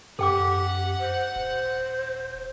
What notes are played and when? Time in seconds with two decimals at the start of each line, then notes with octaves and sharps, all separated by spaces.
0.19 F#2 G4 A4 F#5 G5 D6
1.00 C5
1.36 D#1 C5